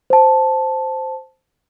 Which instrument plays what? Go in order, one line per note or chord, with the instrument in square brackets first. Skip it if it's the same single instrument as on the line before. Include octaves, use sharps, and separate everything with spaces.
[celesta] C5 A5